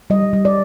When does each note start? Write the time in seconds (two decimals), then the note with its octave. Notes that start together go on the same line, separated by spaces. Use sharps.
0.10 G3 D#5
0.33 G3
0.45 D5